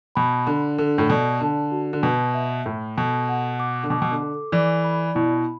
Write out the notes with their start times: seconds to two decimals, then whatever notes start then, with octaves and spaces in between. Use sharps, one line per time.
0.15 B2 B5
0.47 D3 D4
0.78 D3 A4
0.98 A2
1.10 B2 D5
1.40 D3 A5
1.72 F#4
1.93 D3
2.03 B2 B4
2.34 E5
2.65 A2 A4
2.98 B2 A4
3.29 F#5
3.60 D6
3.83 D3
3.90 B2 D6
4.02 B2
4.11 D3
4.22 A4
4.52 E3 D5
4.84 B5
5.15 B2 E4